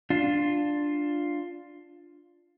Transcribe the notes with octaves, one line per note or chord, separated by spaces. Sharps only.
D4 F4